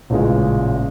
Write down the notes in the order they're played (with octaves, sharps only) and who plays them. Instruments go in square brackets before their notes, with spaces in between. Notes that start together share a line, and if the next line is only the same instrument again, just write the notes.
[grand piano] A1 A#2 C#3 G#3